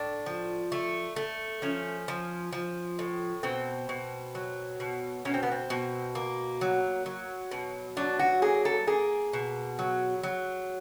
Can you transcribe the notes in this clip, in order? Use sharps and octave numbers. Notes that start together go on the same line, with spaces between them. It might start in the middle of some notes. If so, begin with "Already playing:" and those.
Already playing: A2 D4
F3
A3
A3
F3 C#4
F3
F3
A2
B2 C4
B2
F#3
B2
B2 C#4
C4
B3
C4
B2
A#3
F#3
F#3
B2
F#3 D4
F#4
A#3 G#4
A4
A#3 G#4
B2
F#3
F#3